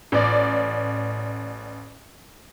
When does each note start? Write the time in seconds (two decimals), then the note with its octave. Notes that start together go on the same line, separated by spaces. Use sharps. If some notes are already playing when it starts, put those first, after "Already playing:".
0.12 A1 D5